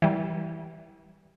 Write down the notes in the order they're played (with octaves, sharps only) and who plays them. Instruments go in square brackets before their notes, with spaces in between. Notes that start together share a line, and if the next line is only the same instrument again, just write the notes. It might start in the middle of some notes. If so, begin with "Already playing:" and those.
[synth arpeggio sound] E3 G3